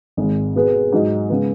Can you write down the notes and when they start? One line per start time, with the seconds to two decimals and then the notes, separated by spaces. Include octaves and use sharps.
0.17 G#1 G#2 G#3
0.55 B2 B3 G#4 B4
0.92 G#2 F#3 D#4
1.29 C#3 G#3 B3